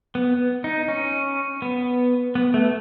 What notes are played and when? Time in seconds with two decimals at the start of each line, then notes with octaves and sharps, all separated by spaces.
0.15 B3
0.64 D#4
0.88 C#4
1.62 B3
2.35 B3
2.54 A3